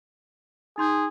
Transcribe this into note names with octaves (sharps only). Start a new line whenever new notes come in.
D#4 G#4 C6 G6